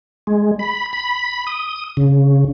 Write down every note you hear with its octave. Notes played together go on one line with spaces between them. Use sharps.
G#3
B5
B5
D#6
C#3